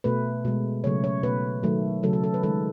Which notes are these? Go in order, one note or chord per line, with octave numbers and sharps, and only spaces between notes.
B2 A3 B4
B2 G#3
C#3 F#3 A3 C#5
C#5
B2 A3 B4
D#3 F#3 A3
C#3 F#3 A3 A4
A4
A4
B4
D#3 G#3 A4